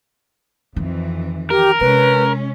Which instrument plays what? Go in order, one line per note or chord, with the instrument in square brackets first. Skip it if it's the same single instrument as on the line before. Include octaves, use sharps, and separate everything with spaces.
[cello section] F2 E3 [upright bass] D#3
[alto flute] G4 [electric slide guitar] A#4
[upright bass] C3 [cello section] G#3 C#4 [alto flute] B4